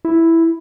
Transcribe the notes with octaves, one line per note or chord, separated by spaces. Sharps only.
E4